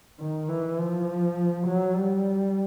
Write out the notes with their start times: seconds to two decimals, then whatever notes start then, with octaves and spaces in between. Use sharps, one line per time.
0.20 D#3
0.49 E3
0.78 F3
1.67 F#3
1.96 G3